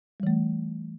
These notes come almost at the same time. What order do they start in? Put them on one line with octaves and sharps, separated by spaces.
G3 E3 A3